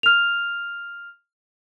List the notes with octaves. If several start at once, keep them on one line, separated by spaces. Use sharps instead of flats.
F6 F7